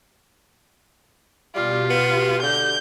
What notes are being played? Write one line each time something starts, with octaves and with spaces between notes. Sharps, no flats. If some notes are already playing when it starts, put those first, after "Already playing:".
B2 G3 F4 G4
B3
D3 G6